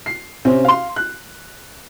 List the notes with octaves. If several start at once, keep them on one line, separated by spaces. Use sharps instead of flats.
C7
C3 C4 C#4
F5 C6
F#6